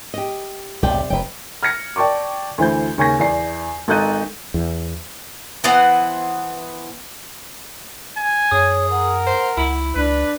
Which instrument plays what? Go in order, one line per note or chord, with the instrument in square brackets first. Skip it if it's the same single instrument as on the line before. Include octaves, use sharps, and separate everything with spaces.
[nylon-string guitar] G4 D#5
[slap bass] B1 E2 A2 [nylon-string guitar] C3 D5 G5
[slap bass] F1 F#3 [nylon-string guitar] B4 G5
[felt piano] F6 G#6 A#6 C#7
D5 G5 A5 C#6 D6
D2 E3 C5 G6
D#2 C#3 C#4 C#6 G6 A#6
E2 D5 C7
G#1 D#4 A4 F#6 G6 D#7
[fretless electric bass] E2
[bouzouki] E3 B3 C5 F#5
[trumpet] G#5
[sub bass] F#2 [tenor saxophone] G#4 [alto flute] C#5
[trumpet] A#4 [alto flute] F#5
[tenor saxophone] C5
[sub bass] C#2 [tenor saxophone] E4
[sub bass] C#2 [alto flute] D4 [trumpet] B4